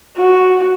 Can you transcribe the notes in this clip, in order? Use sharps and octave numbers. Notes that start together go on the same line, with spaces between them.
F#4